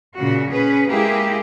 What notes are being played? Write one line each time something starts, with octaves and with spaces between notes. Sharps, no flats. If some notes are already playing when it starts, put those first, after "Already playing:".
A#2 C#3 F#4
C#4 G#4 B4
G#3 A#3 E4 G4 G#4